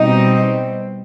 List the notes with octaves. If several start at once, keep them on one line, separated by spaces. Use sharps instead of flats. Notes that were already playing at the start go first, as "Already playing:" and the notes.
Already playing: B2 G3 C4 D#4